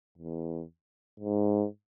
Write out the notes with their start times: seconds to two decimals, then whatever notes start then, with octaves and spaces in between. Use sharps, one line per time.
0.18 E2
1.20 G#2